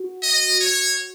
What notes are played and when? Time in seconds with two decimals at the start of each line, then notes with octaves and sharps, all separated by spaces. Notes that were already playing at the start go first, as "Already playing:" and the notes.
Already playing: F#4
0.23 D#5
0.61 C#5